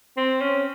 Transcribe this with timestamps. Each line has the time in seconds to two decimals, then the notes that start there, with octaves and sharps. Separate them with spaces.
0.17 C4
0.41 C#4